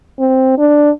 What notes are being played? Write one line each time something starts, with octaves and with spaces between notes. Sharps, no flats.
C4
D4